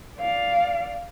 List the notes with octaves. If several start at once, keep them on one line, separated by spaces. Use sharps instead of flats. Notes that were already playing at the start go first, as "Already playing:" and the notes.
D5 F5